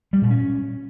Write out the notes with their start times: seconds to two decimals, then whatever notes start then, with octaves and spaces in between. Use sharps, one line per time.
0.13 G3
0.22 A#2
0.30 C#4